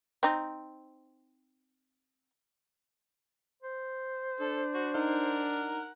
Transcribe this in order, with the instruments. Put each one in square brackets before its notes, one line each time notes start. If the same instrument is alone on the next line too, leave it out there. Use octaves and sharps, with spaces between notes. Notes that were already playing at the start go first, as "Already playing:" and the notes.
[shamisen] C4 D#4
[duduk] C5
[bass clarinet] D4 [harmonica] A4
[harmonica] F#4
[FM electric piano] D#4 [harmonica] A#4 F#5